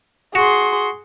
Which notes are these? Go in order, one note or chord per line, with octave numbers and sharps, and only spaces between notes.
F#4 G#4 C6